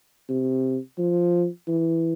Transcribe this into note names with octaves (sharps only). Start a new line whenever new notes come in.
C3
F3
E3